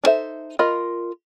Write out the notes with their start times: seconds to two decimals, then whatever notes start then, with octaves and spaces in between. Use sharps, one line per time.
0.04 D4 D#4 A4 C5 E5
0.59 F4 A#4 D#5 B5